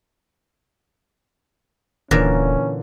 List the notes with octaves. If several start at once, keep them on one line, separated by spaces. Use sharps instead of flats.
D#1 A#2 D3 E3 A#3 C#4 A#4